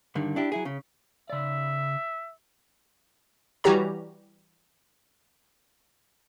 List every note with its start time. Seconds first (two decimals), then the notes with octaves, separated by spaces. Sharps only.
0.15 G2 D3 D#3
0.36 D4 E4 G4
0.52 F#3 E4 G#4
0.65 C#3
1.30 C#3 D5 E5
3.64 E3 G3 F#4 G4 C#5 A#5